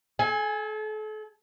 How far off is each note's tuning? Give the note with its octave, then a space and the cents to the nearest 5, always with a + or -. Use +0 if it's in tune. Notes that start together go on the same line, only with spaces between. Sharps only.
A4 -40 G#5 +0